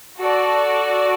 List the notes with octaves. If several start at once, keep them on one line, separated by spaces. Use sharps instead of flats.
F#4 A4 D5